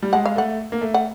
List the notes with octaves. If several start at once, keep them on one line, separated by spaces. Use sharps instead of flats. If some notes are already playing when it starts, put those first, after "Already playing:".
G3
G#3 F#5
F5
A3 F#5
A#3
A3
F#5